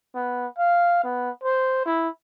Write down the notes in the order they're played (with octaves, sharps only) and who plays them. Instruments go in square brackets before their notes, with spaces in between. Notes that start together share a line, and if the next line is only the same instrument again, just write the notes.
[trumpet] B3
F5
B3
C5
E4